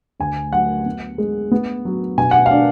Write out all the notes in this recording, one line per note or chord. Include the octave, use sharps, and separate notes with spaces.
D2 G#5
F#3 F#5
B3
G#3
B3
F#3
B2 G#5
F#5
F5
D4